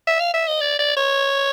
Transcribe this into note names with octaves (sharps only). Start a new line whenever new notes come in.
E5
F5
E5
D#5
D5
D5
C#5